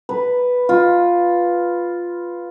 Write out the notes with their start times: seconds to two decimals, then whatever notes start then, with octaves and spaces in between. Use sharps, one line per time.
0.09 B4
0.69 F4